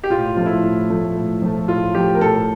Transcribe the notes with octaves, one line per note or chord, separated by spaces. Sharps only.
G4
A2 F4
F3 A3 F4
E4
A2
F3 A3
A2
F3 A3
A2 F4
F3 A3 G4
A#4
A2 A4